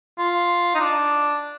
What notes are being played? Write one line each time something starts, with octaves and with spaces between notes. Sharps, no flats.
F4
D#4
D4